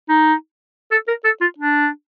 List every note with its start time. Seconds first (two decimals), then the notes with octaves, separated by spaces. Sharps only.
0.09 D#4
0.91 A4
1.08 A#4
1.24 A4
1.41 F4
1.58 D4